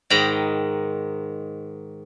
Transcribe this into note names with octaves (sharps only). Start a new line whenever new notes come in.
G#2 D#3 G5 A#5 B5